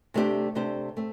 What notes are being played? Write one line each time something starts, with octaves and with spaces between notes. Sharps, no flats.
C3 A3 D4 G4 C5
C3 A3 D4 G4 C5
A3 C4